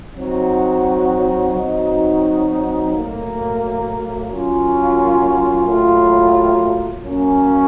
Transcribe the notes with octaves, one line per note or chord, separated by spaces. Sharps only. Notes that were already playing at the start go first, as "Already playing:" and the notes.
F#3 C4 D#4 F#4
F#3 C4 D#4 F#4
A2 F#3 A#3
F#3 A#3 C#4 F4
A2 F#3 A#3 F4
F#3 A#3 C#4